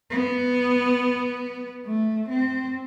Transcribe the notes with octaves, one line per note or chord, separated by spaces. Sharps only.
B3
A3
C4